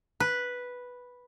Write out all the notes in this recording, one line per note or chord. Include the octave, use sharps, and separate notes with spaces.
B4